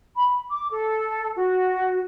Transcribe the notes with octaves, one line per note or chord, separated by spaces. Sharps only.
B5
D6
A4
F#4